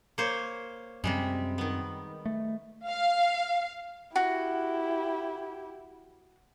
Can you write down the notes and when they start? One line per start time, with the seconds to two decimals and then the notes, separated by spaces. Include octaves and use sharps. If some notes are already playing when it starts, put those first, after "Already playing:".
0.18 A#3 C5 C#5
1.04 F#2 C3 G3 G#3 C4
1.58 D#3 B3
2.26 A3
2.86 F5
4.16 E4 F#4 G4